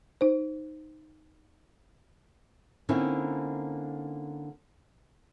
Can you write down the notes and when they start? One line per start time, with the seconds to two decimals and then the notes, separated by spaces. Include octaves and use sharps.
0.21 D#4 C5
2.89 D3 A#3 C4 C#4 D#4 E4